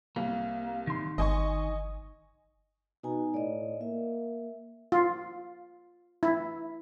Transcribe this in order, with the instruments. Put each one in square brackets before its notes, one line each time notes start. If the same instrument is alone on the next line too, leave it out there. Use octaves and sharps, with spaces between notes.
[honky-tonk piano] C2 [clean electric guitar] A#3
[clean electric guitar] D#3 C6
[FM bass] G1 [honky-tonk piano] D#5 G#5 C#6
[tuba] B2 [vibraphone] D#4 G#5 A#5
[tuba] A2 [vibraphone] D5 D#5
[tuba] A#3 [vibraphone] E5
[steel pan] F4
E4